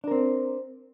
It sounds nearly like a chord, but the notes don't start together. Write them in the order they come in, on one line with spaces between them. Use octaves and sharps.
D4 A#4 C4